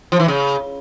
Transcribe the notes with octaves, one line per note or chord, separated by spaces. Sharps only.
F3
E3
C#3